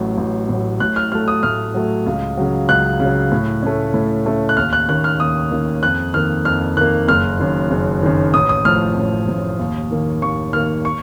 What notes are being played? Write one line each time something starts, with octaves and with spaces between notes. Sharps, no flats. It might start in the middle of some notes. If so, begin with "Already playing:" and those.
Already playing: A1 A2 F#3
A1
A2 F#3
A2 F#6
F6
F#3 A3 F6
D#6
A2 F6
F#3 A3
C#2
C#3 F#3
C#2 F#6
C#3 F#3
A2
A3 C#4
A2
A3 C#4
F#6
D#2 F6
F#6
D#3 A#3 C#4 F#6
F6
D#2 D#6
D#3 A#3 C#4
F2 F#6
D#3 A#3 F6
F2 F6
D#3 A#3 F#6
F#1 F6
F#2 D#3
F#1
F#2 D#3
A1 D#6
D#6
A2 F3 F6
A1
A2 F3
D#2
D#3 A#3
D#2 C#6
D#3 A#3 F6
C#6